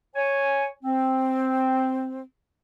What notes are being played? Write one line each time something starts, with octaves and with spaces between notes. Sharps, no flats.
C#5 G#5
C4